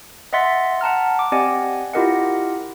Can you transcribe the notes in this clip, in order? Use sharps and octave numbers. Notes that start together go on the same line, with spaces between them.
D#5 E5 F#5 C6 A6 B6
F#5 A5 A#5 F6
D6
C4 G4 D5 D#5 F#5 G#5
E4 F4 G4 A#4 D#5 F#5